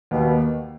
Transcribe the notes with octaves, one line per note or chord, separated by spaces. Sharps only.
D#2 B2